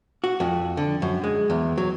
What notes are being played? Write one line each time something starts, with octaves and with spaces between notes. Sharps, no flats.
F#4
F2
D3
F#2
G#3
E2
F#3